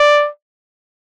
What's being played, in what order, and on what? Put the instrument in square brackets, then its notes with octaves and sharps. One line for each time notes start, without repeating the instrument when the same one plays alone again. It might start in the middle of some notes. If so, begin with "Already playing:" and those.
Already playing: [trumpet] D5